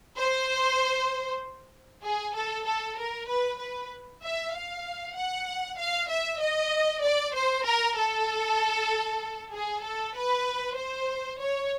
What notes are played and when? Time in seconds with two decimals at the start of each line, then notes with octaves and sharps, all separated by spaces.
0.18 C5
2.05 G#4
2.36 A4
2.67 A4
2.99 A#4
3.30 B4
3.61 B4
4.24 E5
4.54 F5
5.17 F#5
5.78 F5
6.10 E5
6.41 D#5
7.03 D5
7.35 C5
7.67 A#4
7.97 A4
9.53 G#4
9.84 A4
10.16 B4
10.77 C5
11.41 C#5